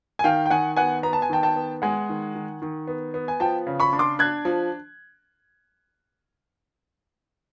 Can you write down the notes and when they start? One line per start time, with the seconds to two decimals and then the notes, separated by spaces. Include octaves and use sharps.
0.19 G#5
0.24 D#3 F5 G5
0.46 G5
0.50 D#3 F#5 G#5
0.77 B3 F#5 G#5
1.03 B3 A#5
1.13 A5
1.22 G#5
1.30 D#3 G5 A5
1.43 G5 A5
1.56 B3
1.82 G#3 F#5 G#5
2.09 D#3
2.35 D#3
2.62 D#3
2.87 B3
3.14 B3
3.28 G#5
3.40 F3 G5 A5
3.67 C#3
3.80 B5 C#6
3.93 D4
3.99 C6 D6
4.19 D4 F#6 G#6
4.45 F3